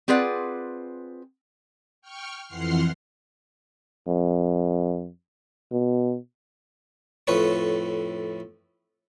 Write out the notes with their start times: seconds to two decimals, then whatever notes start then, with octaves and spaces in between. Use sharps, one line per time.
0.08 C4 F4 G#4 B4 D5 F#5
2.02 G5 C#6 F6
2.46 F2 E3 F#5 C6 F6 C7
4.08 F2
5.72 B2
7.27 F2 A2 B4 C#5 C#6